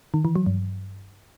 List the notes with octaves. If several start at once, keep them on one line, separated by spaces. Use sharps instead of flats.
D#3
E3
F#3
G2